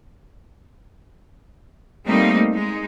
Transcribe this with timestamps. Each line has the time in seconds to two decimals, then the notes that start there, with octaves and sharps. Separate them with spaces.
2.06 G3 A3 A#3 C4 D#4
2.51 G#3 D#4